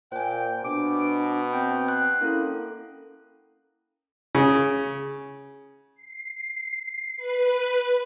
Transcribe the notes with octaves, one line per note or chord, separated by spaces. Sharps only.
A#2 C5 G5 G#5
B2 D4 D6
C4 G5
F#5 C6 F#6
A#3 C#4 E4 A4
C#3
C7
B4